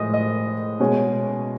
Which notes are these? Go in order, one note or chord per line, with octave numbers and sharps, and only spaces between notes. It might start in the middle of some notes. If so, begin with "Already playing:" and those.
Already playing: A2 F3 G#3 D#5
D#5
B2 G#3 C#4